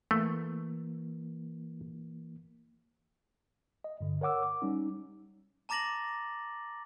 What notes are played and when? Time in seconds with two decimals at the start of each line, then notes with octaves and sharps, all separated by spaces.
0.11 E3 A3 A#3
3.84 D#5
4.01 G2 D3
4.21 A#4 C#5 F#5 D6 E6
4.43 D6
4.62 G3 C#4 D#4
5.69 A5 A#5 D6 A6 A#6 F#7